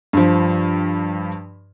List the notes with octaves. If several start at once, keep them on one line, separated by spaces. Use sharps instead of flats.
G2 F3